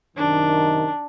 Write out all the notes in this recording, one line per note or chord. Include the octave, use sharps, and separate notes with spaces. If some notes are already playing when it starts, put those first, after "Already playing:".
F#2 C3 D#3 D4